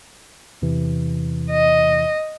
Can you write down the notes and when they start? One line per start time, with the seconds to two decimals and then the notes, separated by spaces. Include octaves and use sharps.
0.62 E2 C3 E3
1.51 D#5